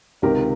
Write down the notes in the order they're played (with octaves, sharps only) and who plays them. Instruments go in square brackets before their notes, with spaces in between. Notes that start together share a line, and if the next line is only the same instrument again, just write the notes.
[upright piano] C#2 C3 D#3 G4 A#4